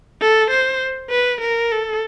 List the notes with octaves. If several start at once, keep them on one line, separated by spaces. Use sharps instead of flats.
A4
C5
B4
A#4
A4